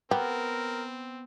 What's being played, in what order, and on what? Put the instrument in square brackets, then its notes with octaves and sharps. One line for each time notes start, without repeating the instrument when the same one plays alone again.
[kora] B3 [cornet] C4 [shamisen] G4 [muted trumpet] A#4